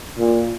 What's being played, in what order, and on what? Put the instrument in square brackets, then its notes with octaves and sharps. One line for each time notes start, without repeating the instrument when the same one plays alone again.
[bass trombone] A#2